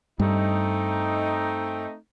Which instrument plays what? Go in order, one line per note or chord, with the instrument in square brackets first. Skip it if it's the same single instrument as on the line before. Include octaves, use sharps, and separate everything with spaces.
[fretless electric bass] G2 [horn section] A3 C4 D#4